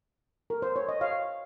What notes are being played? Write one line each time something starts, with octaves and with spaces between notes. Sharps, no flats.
A#4
C5
C#5
D#5
C#5 F5